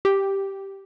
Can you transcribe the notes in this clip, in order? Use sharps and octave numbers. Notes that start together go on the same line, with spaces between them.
G4